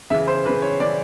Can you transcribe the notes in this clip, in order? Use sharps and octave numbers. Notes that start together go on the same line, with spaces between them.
C#3 E3 E5
C5
C#3 E3 B4
C#5
C#3 E3 D5